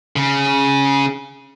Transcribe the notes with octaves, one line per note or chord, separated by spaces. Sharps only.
C#3